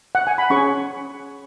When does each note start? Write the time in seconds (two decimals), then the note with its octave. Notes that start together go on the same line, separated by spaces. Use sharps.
0.15 F#5
0.27 G#5
0.38 B5
0.50 C#4 G#4 C#5 C#6